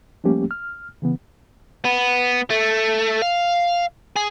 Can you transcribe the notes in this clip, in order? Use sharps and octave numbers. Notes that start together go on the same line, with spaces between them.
F3 G3 A3 A#3 C#4 G4
F6
C#3 E3 B3
B3
A3
F5
G#4